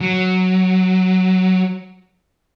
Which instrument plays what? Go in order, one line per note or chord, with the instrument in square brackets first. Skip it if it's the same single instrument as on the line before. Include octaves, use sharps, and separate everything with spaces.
[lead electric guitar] F#3